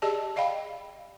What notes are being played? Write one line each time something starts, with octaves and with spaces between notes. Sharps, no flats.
G4 G#4 D5 D#5 A5
D5 D#5 F5 G5 B5